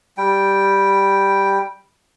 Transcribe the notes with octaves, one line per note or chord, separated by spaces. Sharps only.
G3 G5